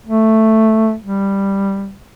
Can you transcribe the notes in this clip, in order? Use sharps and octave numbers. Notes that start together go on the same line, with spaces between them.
A3
G3